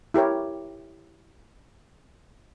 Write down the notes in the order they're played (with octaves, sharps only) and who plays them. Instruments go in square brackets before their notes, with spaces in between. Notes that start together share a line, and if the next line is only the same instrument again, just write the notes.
[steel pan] E4 G4 A#4 C#5